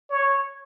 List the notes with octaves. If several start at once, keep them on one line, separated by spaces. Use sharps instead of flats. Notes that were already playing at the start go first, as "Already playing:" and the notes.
C#5